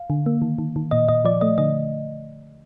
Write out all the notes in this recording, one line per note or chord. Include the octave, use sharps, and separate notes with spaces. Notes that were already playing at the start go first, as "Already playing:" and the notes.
Already playing: F5
D3
A#3
D#3
D#3
D#3
A#2 D#5
A#2 D#5
F3 D5
A3 D#5
D3 D#5